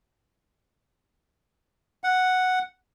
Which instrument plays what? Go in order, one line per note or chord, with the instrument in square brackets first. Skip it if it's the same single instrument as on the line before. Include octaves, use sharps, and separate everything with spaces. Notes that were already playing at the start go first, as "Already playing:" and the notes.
[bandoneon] F#5